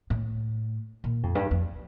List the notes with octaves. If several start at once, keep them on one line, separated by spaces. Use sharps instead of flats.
A2
A#2
F2
G2
F2